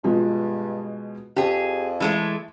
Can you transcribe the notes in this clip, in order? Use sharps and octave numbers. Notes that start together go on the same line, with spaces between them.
G2 B2 F3 G#3
F2 G4 G#4 A5
E3 G#3 A3 A5